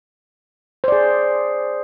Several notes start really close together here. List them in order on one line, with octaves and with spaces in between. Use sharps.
C5 D5 G#4